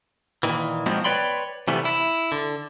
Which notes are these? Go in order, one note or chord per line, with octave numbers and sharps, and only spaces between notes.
A#2 D#3 E3
B2 F3 F#3 G#3 B3 C4
B4 C#5 D5 G5 B5 C6
C3 E3 G3 A3 B3
E4
D3